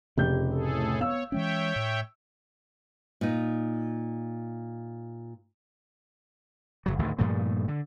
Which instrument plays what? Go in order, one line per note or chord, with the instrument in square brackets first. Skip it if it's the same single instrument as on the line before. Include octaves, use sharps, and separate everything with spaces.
[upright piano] F1 G4 G6 [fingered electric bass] C#3
[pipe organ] A2 G#4 A4
[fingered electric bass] B3 [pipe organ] C#5 [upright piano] F5 E6
[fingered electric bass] E3 G#3 C#4 [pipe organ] C#5 E5 G5
[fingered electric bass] A2
[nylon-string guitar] A#2 D#4
[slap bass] F#1 C#2 F#3
G#1 D2 A2 D#3
G2 A#2 F3 A3
D3